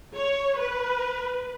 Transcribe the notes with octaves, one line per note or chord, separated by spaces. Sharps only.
C#5
B4